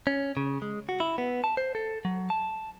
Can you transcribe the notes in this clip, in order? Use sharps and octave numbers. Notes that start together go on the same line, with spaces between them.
C#4
C#3
G#3
F#4
E4
B3
A5
C5
A4
F#3
A5